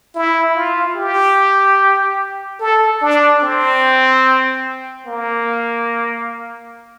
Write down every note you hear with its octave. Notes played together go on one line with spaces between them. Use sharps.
E4
F4
G4
A4
D4
C4
A#3